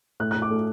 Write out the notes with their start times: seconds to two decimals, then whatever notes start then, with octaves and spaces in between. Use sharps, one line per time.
0.20 A2 F#6
0.31 A2 F#6
0.42 D6
0.50 A3